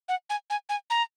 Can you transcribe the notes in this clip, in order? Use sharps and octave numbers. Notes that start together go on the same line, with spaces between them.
F#5
G#5
G#5
G#5
A#5